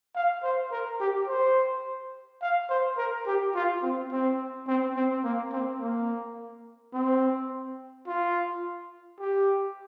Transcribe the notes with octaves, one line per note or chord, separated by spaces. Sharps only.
F5
C5
A#4
G4
C5
F5
C5
A#4
G4
F4
C4
C4
C4
C4
A#3
C4
A#3
C4
F4
G4